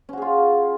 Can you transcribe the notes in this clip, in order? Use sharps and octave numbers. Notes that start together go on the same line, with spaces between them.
C#4 F4 F#4 G#4